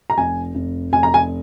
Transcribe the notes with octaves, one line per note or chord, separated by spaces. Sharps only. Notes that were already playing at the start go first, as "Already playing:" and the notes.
A#5
F1 G#5
F1
F1 G#5
A#5
G#5